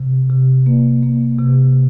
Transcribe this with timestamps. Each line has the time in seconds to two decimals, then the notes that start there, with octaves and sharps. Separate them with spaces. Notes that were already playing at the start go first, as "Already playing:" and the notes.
Already playing: C3
0.30 C3
0.66 A#3
1.03 A#3
1.39 C3